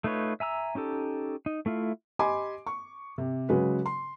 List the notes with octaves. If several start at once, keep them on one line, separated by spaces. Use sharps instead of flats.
A3 D#4 F4 B4 C#5
E5 G#5 A#5 E6
C#4 D#4 G4 A4
D#4
A3 E4 F4
G4 D#5 G#5 B5 C6 D6
C#6
C3
C#3 F#3 G#3 F#4 B4
C6